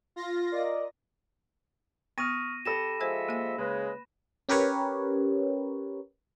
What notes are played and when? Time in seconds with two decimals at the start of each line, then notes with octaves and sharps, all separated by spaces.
0.16 F4 A#6
0.53 A#4 D5 D#5
2.18 B3 C#6 D#6 F6 A#6 D#7
2.65 G4 A4 B5 A#6 E7
3.01 F3 G#3 C5 E5 G#5
3.29 A#3 G#5
3.58 C#3 G#3 B4
4.49 C#4 G4 A#4 B4 C#5